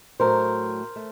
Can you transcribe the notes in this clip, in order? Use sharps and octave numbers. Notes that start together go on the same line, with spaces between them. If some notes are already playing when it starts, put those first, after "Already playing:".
A2 F#3 A3 A#4 C5
A3